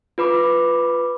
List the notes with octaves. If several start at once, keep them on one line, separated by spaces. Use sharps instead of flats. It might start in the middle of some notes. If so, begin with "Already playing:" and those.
F4 B4 B5 D6